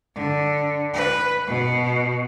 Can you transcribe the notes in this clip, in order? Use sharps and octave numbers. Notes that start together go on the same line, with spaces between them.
D3
B4
B2